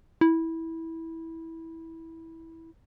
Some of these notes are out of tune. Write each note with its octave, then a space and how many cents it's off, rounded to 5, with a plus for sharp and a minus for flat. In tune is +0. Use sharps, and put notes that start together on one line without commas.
E4 -15